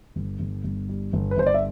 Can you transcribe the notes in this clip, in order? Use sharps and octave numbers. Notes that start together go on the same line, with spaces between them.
G1
G1
G1
G3
G1
B4
G1 C5
D5
E5